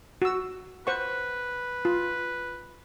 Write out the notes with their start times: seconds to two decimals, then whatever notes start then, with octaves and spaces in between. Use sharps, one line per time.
0.22 F#4 E6
0.87 B4 C5 F#5 C#6
1.85 F4